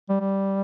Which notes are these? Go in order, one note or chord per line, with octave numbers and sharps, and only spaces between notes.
G3
G3